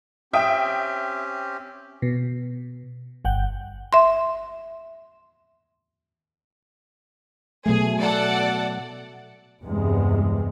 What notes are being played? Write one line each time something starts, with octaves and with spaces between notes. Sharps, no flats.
C4 C#4 G4 E5 G5 D#6
B2
G1 F#5 G5
E5 C6
B2 F#3 A3 G#4
A4 D5 F#5
E2 G2 C3 G#3